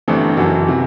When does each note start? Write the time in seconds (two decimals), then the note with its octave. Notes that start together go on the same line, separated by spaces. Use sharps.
0.08 G1 G2 E3 A3 C4
0.37 F#1 F#2 E3 F#4 A4
0.68 C3 E3